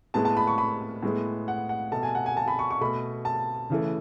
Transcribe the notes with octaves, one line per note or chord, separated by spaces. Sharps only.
A2 G#3 B3 A5
A5
B5
C#6
B5
A2 G#3 B3
F#5
F#5
B2 A3 A5
G#5
F#5
G#5
A5
B5
C#6
C#6
B2 A3 B5
A5
C#3 E3 A3